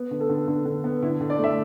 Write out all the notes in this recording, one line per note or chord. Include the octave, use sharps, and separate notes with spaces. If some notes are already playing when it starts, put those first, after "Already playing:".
Already playing: B3
D3
A4
D3
D3
D3
B3
D3 E4
D3
D5
A3
E5